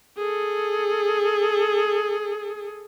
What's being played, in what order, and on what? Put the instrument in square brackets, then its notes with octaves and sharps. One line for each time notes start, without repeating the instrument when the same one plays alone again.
[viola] G#4 A4